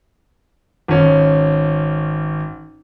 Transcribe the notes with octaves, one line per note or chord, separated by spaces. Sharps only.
G#1 C#4